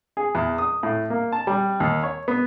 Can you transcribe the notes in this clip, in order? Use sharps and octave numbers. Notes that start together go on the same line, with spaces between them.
G#4
E2
D#6
A2
A#3
A5
G3
D#2
C#5
B3